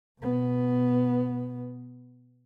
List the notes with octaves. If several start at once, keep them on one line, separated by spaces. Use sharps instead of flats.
B2 B3